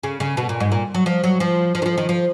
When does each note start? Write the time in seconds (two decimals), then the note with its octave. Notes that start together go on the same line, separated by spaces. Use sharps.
0.03 C#3
0.20 C#3
0.37 B2
0.49 A#2
0.60 G#2
0.72 A#2
0.94 F#3
1.06 F3
1.24 F#3
1.40 F3
1.75 F3
1.82 D#3
1.86 F3
1.98 D#3
2.09 F3